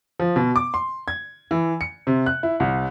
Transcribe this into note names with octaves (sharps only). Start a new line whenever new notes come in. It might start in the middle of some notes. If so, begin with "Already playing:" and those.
F3
B2
D6
C6
G#6
E3
C#7
C3
F#6
E4
C2